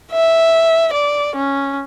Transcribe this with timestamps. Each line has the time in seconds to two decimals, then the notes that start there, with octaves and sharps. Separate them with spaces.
0.12 E5
0.93 D5
1.36 C#4